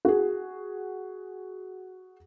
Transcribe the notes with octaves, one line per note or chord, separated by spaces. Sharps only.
F#4 G#4